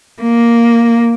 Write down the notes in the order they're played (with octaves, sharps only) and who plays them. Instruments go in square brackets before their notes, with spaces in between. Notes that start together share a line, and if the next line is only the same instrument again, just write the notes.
[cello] A#3